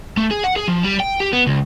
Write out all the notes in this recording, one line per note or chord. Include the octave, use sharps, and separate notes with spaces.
A3
G#4
F#5
G#4
F3
G3
G5
G4
B3
C#2